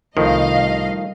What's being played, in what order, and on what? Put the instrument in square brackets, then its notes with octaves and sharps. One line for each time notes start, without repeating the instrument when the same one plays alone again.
[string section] C2 D#5 F5 [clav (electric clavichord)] A2 D#3 F3